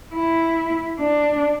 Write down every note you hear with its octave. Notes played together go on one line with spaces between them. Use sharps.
E4
D4